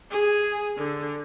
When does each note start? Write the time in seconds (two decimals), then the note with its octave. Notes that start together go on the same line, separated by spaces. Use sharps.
0.11 G#4
0.77 D3